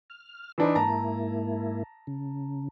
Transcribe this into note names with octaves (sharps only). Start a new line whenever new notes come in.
F6
E3 D4 D#4 C5
G#2 A#3 E4 A5 A#5
C#3